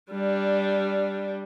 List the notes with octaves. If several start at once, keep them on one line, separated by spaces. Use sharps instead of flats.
G3 D4